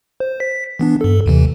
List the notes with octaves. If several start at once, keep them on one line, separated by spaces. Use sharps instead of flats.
C5
B6
E3 B3 D4
G2 A4
D#2 C3 E3